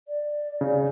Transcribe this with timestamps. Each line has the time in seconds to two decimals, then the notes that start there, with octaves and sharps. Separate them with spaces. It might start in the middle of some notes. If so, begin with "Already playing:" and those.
0.07 D5
0.61 C#3